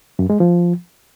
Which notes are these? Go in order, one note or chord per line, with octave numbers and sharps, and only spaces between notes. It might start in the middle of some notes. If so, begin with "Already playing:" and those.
F#2
G#3
F3